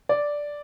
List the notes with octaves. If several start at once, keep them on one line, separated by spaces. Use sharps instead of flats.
D5